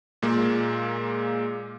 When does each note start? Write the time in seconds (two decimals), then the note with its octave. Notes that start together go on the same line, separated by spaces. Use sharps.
0.22 A#2 G#3 A#3